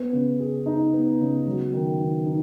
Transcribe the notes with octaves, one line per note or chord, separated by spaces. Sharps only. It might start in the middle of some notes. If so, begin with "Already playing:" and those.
Already playing: B3
C#3
G#4
D#4
B3
C#3
F#3
D#3
D#3
D#4